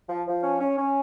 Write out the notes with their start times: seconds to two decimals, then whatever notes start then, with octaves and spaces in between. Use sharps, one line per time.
0.09 F3
0.27 F3
0.43 C#4
0.60 C#4
0.78 C#4